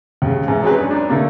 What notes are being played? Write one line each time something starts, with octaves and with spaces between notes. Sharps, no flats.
D#2 C#3
G#2 E3
F#3 G#3 C4 C#4 G#4 B4
C#4 D4
D4 D#4
D3 A3 A#3